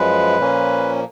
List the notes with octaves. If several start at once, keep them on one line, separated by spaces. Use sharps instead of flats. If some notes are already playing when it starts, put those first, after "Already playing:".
Already playing: F#2 F3 G#3 B4
A#2 F3 A#3 C#4